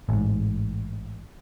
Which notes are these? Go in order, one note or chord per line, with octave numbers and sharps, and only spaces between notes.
A1 G#2